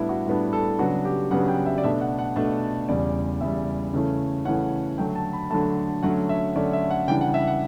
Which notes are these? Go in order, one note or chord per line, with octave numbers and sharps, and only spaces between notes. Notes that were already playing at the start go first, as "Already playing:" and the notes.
Already playing: A2 G3 B3 D4 E4
F#4
A2 G3 B3 D4
A4
C#3 F#3 B3 D4 F#4
G4
C#3 F#3 B3 D4 F#5
G5
E5
D5
B2 A3 D4 E5
F#5
F#5
B2 A3 D4 A5
E2 C#3 G3 D5
E2 C#3 G3 E5
C#3 E3 A3 C#4
C#3 E3 A3 C#4 F#5
D3 F#3 A3 G5
A5
B5
D3 F#3 A3 A5
D3 F#3 A3 C#4 F#5
E5
D3 F#3 A3 C#4 D5
E5
F#5
C#3 E3 G3 D4 G5
F#5
E5
F#5